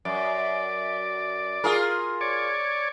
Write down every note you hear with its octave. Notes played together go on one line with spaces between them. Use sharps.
F#2 D5
F4 G#4 A#4
C#5 D5